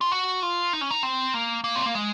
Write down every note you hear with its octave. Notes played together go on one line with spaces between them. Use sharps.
F4
F#4
F4
D#4
C#4
D#4
C4
A#3
A#3
C4
A#3
G#3